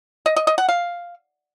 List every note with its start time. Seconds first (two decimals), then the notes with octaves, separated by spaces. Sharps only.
0.26 D#5
0.36 D#5
0.47 D#5
0.58 F#5
0.69 F5